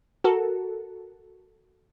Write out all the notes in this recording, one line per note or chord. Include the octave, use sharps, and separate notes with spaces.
F#4 A4 A#4